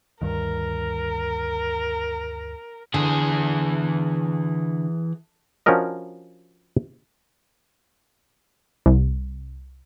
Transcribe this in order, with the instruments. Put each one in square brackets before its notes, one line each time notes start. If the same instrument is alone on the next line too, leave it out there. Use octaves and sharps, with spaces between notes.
[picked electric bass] D2 G2 D#3 [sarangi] A#4
[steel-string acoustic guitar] D3 [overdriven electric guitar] E3 G#4
[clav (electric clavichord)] F3 C#4 D4 F#4 A#4 D#5
[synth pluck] C2